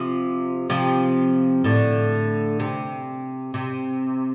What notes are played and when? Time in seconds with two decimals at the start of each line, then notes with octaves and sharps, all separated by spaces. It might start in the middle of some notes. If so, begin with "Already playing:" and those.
Already playing: C3 F3
0.70 C3 F3
1.64 A2 D3
2.60 C3
3.54 C3